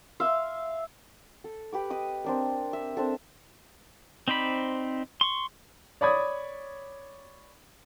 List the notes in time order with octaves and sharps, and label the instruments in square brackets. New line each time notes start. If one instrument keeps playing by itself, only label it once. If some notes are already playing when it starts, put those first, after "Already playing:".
[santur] E5 F5 C6
A4
G4 B4 D6
B4 D#5 D#6
C4 D4 A#4
E5
C4 D4 A4
[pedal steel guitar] C4 D#4 C5 D5 B5
C6 C#6
[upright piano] C#5 D5 B5 D#6 G#6